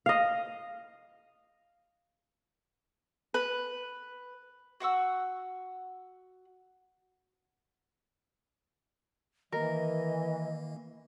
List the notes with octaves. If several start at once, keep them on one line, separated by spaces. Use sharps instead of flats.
D#5 F5
B4
F#4 F#5 C#6 E6
D#3 E3 A#3 A#4 D#5